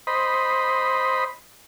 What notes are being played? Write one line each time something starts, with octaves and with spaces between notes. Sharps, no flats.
C5 D#5 B5